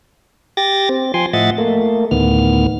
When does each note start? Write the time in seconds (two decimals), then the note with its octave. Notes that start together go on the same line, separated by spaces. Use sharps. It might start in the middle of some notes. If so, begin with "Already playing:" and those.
0.57 G4 G5 A6 A#6
0.89 C4
1.14 F3 G5 G#5 C6
1.33 A2 F3 D#5 E5 F#5 A6
1.58 A3 A#3
2.11 D2 A2 D#3 B3 F6